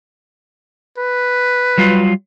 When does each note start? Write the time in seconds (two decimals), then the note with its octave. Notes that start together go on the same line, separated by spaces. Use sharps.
0.98 B4
1.78 F#3 G3 F4